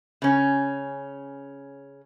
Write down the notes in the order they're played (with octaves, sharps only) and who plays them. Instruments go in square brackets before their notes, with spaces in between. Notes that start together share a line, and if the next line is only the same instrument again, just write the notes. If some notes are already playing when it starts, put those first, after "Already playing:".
[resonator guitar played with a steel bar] C#3 C#4